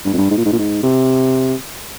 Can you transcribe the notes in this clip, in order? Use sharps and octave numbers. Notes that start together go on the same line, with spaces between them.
G2
F2
G2
G#2
A#2
G#2
A#2
G#2
C3